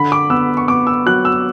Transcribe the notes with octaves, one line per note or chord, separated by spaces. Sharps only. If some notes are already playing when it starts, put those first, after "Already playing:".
Already playing: D3 B5
D6
B3 E6
C#6
B3 D6
E6
F#3 F#6
E6